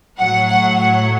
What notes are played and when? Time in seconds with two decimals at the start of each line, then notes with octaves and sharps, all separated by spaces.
0.16 A2 F#3 A3 F#5
0.47 F#5
0.78 F#5